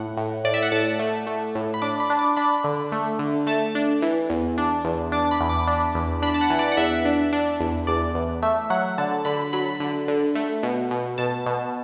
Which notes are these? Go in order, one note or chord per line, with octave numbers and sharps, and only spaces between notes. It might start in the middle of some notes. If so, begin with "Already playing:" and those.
Already playing: A2 F#5
A2
A2 D5
E5
F#5
A2 A5
A3
A3
A2
B5
D4 D6
B5
D4
D6
D4 B5
D3
A3
D3
A3 A5
D4
E3
E2
D4
E2
D4 D6
B5
E2
D6
D4
E2
D4 B5
A5
F#5
E3
D5
F#5
E2 E5
D4
D4
E2
E2 D5
E2
A3 E5
F#3 F#5
D3 A5
D3 B5
F#3 B5
D3
D3
A3
B2
B2
B2 A5
B2